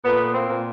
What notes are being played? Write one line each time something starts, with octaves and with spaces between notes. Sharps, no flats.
A#2 A3 B3
A#3 C4
A#2